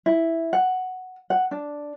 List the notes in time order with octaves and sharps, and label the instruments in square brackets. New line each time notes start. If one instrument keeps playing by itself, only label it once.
[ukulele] E4
F#5
F#5
D4